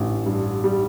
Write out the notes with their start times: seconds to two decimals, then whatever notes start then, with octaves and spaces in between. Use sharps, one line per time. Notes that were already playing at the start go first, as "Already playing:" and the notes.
Already playing: A1 D3
0.26 G2
0.64 G3